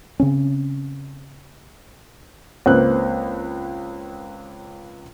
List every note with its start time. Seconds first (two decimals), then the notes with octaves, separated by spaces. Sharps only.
0.20 C#3 C4 C#4
2.66 C#2 A#3 C4 B4 F#6